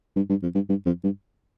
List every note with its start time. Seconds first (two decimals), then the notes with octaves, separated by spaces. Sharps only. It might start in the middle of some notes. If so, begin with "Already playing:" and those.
0.16 G2
0.29 G2
0.43 F2
0.55 G2
0.69 G2
0.86 F2
1.03 G2